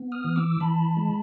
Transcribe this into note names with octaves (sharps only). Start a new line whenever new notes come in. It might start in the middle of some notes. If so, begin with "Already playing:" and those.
Already playing: B3
D#6 F6
E3
D6 E6
E3 A5 B5
G#3